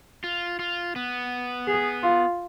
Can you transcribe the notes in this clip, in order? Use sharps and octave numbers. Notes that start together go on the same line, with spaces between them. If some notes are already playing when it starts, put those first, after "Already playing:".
F4
F4
B3
G#4
F4